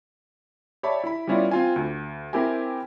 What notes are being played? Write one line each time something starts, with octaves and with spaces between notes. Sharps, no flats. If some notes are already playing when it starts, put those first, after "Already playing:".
G4 C#5 D5 E5 A5 B5
E4 B5
G3 B3 C#4 E4 F4 D5
C4 F4 G#5
D2
C4 E4 G4 A#4 G#5